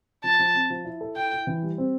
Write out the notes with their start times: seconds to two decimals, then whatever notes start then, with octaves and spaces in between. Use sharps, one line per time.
0.24 F3 A5
0.39 F3
0.54 C4
0.70 F3
0.85 E4
1.01 A4
1.16 E4 G5
1.32 E4
1.47 E3
1.63 G3
1.78 C4